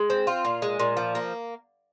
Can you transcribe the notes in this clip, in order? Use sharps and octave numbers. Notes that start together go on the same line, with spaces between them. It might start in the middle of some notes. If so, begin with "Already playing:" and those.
Already playing: G#3
C4
F4
A#2
G#3
A#2
F3
A#3